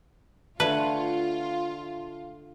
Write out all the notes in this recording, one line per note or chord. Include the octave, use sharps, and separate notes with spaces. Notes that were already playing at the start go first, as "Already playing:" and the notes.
D3 A3 F4 B4 C#5